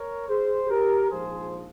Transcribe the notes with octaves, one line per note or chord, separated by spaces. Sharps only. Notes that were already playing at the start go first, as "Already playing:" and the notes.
Already playing: A#4 C#5
G#4 C5
G4 A#4
A#1 G#2 F3 G#4 C5